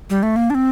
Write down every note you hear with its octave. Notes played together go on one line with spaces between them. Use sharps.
G3
A3
A#3
D4
C4